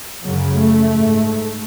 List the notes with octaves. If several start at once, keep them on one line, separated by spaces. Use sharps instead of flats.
F#2 C#3 F#3
A3
G#2